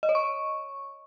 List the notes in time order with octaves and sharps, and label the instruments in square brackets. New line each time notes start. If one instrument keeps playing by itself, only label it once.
[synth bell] D#5
C#5
C#6